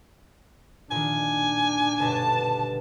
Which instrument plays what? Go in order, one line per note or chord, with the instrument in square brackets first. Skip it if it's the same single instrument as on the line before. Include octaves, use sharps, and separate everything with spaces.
[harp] A#2 D#3 [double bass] D4 [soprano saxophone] G#5
[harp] G1 B2 B4 [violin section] A5